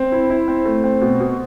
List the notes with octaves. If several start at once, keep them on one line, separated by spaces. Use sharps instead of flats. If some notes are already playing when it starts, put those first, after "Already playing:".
Already playing: C4
E4
E4
C4
A3
C4
B2
B2